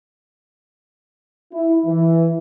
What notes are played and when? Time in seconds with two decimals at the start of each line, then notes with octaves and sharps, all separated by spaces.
1.52 E4
1.86 E3